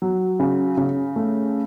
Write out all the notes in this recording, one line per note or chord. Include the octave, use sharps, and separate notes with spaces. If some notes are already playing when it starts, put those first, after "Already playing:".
F#3
C#3
C#3
A3